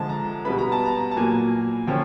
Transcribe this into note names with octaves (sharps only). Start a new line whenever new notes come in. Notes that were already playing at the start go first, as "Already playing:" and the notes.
Already playing: D3 F3 G#3 A5
A#5
B2 G3 B3 B5
A#5
A5
A#5
A5
A#2 F#3 A#3 G#5
D3 F3 A#3 C#4 F4 G5